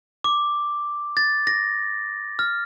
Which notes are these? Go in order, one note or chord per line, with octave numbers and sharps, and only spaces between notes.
D6
A6
A#6
F6